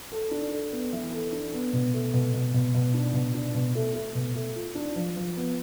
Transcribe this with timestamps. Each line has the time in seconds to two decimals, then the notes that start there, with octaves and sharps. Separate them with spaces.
0.12 A4
0.31 D4
0.52 A4
0.72 B3
0.93 E3
1.12 A4
1.33 D4
1.53 B3
1.73 B2
1.94 A3
2.14 B2
2.34 B2
2.54 B2
2.74 B2
2.94 D4
3.14 B2
3.34 D4
3.54 B2
3.75 A3
3.95 A3
4.15 B2
4.35 A3
4.55 F4
4.75 D4
4.96 F3
5.16 F3
5.37 B3